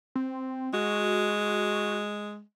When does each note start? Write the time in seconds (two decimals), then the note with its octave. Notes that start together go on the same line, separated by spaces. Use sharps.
0.15 C4
0.73 G#3 F#4